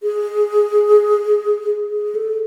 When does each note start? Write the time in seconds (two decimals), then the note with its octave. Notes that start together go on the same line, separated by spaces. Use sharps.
0.03 G#4
1.91 G#4
2.15 A4